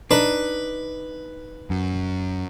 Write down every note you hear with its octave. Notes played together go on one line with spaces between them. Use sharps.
D4 D#4 B4
F#2